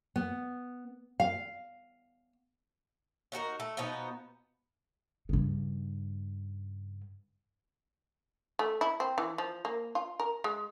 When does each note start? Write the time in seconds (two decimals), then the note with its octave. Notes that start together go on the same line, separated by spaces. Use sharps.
0.16 B3
1.20 F5
3.32 D4 D#4 F#4 A#4
3.60 A3
3.77 B2 F3 B3 D#4
5.29 G2 C#3
8.59 A3
8.81 E4
9.00 C4
9.18 E3
9.38 F3
9.65 A#3
9.95 F4
10.20 A#4
10.44 G#3